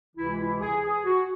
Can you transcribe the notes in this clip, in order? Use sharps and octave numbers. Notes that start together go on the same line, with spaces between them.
C#2 C3 E3 E4
E4
G#4
G#4
F#4